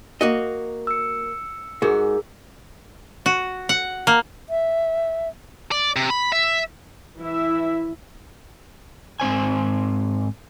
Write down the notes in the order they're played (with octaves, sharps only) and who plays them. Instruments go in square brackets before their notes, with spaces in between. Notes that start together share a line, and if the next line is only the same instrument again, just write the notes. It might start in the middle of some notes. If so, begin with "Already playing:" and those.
[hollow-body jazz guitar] A#3 F#4 D#5
[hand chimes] E6 C#7
[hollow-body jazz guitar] G#2 F#4 [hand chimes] G#4 A#4
[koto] F#4
F#5
A#3
[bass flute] E5
[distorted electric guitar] D5
C3
B5
E5
[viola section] E3 E4 E5
[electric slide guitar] G#2 C4 C5 G#5